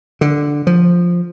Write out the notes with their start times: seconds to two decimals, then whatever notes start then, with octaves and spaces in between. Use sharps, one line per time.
0.21 D3
0.67 F3